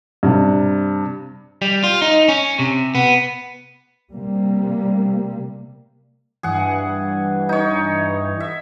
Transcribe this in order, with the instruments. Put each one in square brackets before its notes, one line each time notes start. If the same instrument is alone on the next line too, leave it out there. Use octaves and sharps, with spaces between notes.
[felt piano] G2 C3
[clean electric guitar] G3
F4
D#4
C#4
C3
B3
[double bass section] C3 G3 A#3
[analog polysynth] G2 E3 [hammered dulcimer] G#4 F#5
[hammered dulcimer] D#4 C#5
E5